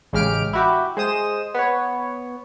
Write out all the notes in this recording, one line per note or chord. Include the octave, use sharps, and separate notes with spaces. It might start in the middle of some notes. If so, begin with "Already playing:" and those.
A1 C#3 G#3 G4 F6 D7
E4 F#4 G4
G#3 C5 D#6 E7
B3 C#5